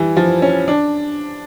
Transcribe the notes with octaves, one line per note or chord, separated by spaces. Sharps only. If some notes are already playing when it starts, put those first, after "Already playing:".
Already playing: E3 G3
F3
C#4
D4